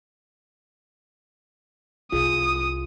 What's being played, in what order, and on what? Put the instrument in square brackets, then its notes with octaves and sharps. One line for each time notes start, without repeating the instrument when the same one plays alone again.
[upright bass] C2 [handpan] F4 G#4 [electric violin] D#6